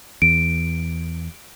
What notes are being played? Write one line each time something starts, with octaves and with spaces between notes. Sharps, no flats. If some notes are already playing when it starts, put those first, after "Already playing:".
E2 D7